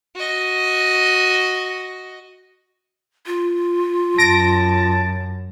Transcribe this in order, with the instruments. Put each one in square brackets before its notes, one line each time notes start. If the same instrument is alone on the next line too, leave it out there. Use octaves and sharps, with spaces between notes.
[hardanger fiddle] F#4 D#5
[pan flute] F4
[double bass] F#2 [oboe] A5 [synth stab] A#6 D7